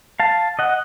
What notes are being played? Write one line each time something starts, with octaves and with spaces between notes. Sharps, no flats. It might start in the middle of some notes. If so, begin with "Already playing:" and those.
F5 A5
D#5 F#5